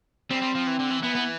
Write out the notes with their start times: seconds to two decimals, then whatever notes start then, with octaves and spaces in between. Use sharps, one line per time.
0.31 G3 C4
0.42 G3
0.55 F3
0.67 E3
0.79 D3
0.91 E3
1.03 E3 B3
1.15 B3